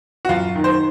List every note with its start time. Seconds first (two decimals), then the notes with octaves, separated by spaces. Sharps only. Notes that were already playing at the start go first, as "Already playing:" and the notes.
0.25 F#4
0.29 F#2 F4
0.56 D#3
0.64 C5